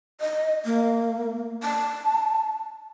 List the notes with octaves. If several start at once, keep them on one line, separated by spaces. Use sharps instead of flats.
D#5
A#3
A5